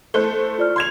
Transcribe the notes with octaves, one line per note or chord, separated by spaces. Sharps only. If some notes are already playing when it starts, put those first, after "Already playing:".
A3 E4 C5 F#6 G7
F4 D5 F6
C6 G#6 F7